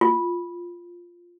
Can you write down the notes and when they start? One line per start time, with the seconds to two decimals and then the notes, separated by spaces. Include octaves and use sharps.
0.01 F4